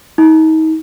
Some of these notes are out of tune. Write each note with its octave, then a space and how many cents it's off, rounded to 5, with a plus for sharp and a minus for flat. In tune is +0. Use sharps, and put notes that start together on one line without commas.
D#4 +35